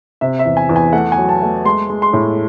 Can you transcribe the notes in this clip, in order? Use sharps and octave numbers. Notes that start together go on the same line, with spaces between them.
C3 E5
E5
E2
G#5
E2
G#5
A3 F#5
G#5
F#3
A5
A3
G#3 C6
G#3
C6
A2